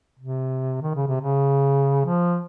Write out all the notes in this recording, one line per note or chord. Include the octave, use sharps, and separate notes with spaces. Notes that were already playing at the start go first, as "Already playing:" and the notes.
C3
D#3
C#3
C3
C#3
F3